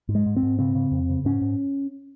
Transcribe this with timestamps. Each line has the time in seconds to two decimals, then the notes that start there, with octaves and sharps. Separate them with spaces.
0.09 G#2
0.15 G#3
0.26 G#2
0.36 C4
0.43 G#2
0.59 C#3 C4
0.75 C#3
0.92 F2
1.09 C#3
1.25 G#2 C#4
1.42 G#2